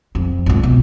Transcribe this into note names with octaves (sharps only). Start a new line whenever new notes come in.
F2
G#1 C#2
B2